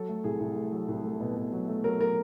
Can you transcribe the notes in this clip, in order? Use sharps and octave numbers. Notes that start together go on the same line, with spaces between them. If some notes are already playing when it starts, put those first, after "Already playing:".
Already playing: F#3 A4
A3
C2 G#4
C2
A3
F#3
C2
A3
B2
B2
F#3
A3
F#3 A#4
F#3 A#4